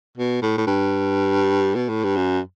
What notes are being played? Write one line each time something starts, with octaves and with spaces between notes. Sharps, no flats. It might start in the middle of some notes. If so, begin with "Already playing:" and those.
B2
A2
A2
G2
B2
A2
G2
F#2